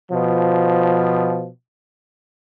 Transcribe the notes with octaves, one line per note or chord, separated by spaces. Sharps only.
B2 F3